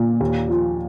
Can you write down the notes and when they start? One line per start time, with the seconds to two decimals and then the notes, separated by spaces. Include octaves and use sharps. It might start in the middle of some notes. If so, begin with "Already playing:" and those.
Already playing: A#2
0.20 D#2
0.49 F3